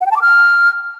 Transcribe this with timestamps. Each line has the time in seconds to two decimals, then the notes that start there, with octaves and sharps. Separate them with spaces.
0.01 F#5
0.06 G5
0.11 A5
0.16 D6
0.21 F6